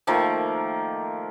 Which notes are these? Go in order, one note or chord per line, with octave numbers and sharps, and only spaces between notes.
D#3 F3 A3 A#3